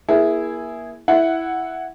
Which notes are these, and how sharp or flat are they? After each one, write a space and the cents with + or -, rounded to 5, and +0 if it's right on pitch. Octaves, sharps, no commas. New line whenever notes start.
A#3 +35 E4 +0 G#4 +0
E4 +0 F#5 +0